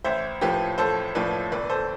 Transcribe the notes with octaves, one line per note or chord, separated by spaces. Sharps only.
A1 C5 E5
A2 F3 G4 B4
A1 A4 C5
A2 F3 B4 D5
G1 B4 D5
A4 C5